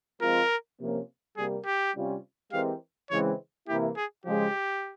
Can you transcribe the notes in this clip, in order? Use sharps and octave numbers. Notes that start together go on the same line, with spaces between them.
F3 G#3 C4 F4 A#4
C3 F3 A#3 C#4
C3 G3 A#3 G#4
G4
C3 G3 C#4 F4
E3 G#3 C4 G4 A#4 F5
C#3 E3 G#3 C4 C#5
C3 E3 A#3 E4 G4
G#4
C#3 F3 G#3 G4